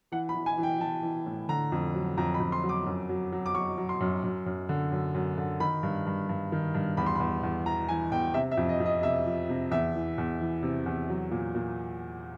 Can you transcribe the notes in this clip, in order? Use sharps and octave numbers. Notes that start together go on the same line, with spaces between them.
E3 F#5
B5
E3
G#5
E3
G5
E3 A5
E3
A2
D3 A#5
F2
F#3
F2 A#5
B5
F2
C6
F#3
D6
F#2
F#3
F#3
D6
F#3 C#6
F#3
C6
F#2
F#2
F#2
D3
F#2
F#2
D3
D#3 B5
G2
G2
G2
D#3
G2
E2 B5
C6
E2 B5
E2
E3 A#5
E3 G#5
E2 G5
C3 E5
E5
F2
D#5
F2
D#5
C3 E5
F3
C3
E2 E5
E3
E2
E3
C3
E2
F#3
A#2
A#2